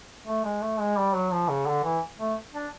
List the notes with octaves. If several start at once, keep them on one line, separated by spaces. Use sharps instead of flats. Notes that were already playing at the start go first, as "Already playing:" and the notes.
A3
G#3
A3
G#3
G3
F#3
F3
C#3
D3
E3
A3
D4